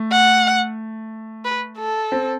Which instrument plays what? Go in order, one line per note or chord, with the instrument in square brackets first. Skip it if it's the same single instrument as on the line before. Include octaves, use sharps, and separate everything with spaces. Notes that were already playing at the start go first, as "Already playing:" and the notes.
Already playing: [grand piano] A3
[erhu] F#5
B4
A4
[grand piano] C4